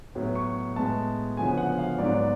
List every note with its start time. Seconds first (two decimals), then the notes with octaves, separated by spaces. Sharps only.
0.15 A2 F#3 B3
0.35 C#6
0.76 A2 G#3 B3 A5
1.37 D2 C#3 F3 B3 G#5
1.58 F#5
1.78 F5
1.98 G#2 F#3 B3 D5
2.14 D5